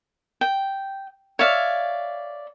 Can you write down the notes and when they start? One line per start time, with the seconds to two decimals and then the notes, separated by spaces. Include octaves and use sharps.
0.41 G5
1.39 C#5 D5 E5 F5